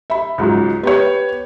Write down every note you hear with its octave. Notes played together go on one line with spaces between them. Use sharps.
E5 B5
C#2 G#2 F#3
B3 G4 C#5